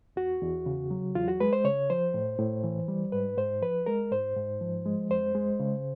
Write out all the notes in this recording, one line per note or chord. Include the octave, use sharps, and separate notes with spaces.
E2 F#4
E2
C#3
F#3
E2 F4
F#4
G#3 B4
C5
C#3 C#5
F3 C5
A2
A2
E3
G3
G#2 B4
G#2 C5
F3 B4
G#3 A#4
G#2 C5
G#2
F3
G#3
F2 C5
G#3
C#3